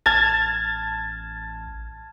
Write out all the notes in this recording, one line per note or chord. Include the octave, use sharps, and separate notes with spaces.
A1 A5 F6 G#6 A6